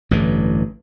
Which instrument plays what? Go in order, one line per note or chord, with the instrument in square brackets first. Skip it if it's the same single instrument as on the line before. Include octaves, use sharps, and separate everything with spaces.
[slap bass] A1 G2 D3 E3